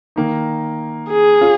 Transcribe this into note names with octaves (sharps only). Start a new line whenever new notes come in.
D#3 A#3 D#4
G#4
C#4 F4